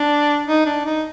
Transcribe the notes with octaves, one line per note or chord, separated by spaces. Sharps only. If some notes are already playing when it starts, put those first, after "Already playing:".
Already playing: D4
D#4
D4
D#4